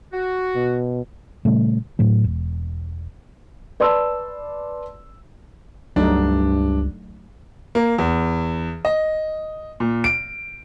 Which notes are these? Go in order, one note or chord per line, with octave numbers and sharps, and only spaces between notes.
F#4
B2
A#2 C#3 G3 A3
A2 F#3 A3
E1
B4 D5 A5 C6 E6
C#2 G2 F#3 A3 D4 D#4
A#3
E2
D#5
A#2
D7